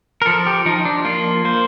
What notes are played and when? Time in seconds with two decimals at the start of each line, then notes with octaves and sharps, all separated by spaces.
0.22 A#4
0.26 F3 A4
0.47 G4
0.66 F3 D#4
0.85 D4
1.05 A#3 F4
1.45 A#3 C5